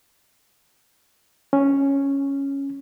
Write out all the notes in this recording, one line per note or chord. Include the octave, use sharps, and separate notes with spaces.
C#4